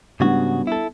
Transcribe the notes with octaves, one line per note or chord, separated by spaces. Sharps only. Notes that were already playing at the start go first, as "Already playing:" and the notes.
G#2 C#3 G3 B3 D4 F#4
E4 A4